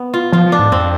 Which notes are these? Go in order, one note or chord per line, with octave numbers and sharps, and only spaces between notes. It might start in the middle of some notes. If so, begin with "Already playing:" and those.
Already playing: B3
F4
F3 F4
F3
D4
G#2
F2 C4